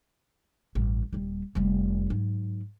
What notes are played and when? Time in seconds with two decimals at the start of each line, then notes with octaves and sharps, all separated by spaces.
0.75 A1 G2
1.13 D#1 G3
1.55 F1 G3
2.10 G#2 F#3